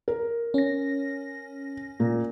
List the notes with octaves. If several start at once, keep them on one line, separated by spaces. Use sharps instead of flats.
A#4
C#4 A#6
A#2